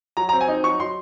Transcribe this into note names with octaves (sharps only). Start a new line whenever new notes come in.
F#3 A#5
A#5
C4
G#5
D#4
F#3 C#6
F#3 C6